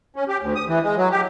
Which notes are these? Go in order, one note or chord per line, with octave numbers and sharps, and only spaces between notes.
C#4
G4
D2
D#6
E3
G#3
F#3
G4